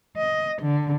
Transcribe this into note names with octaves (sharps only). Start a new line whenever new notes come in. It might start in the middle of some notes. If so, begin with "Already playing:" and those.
D#5
D3